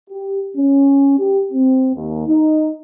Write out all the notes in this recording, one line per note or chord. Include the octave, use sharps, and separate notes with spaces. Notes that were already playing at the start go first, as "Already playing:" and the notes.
G4
C#4
G4
C4
D#2
D#4